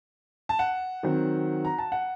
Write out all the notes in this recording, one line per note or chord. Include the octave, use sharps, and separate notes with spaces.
A5
F#5
D#3 F#3 C4
A#5
A5
F#5